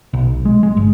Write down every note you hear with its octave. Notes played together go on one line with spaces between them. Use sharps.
B1
G#3
G#3
G1